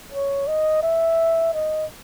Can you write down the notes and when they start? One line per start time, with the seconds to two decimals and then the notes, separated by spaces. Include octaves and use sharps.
0.12 C#5
0.48 D#5
0.83 E5
1.53 D#5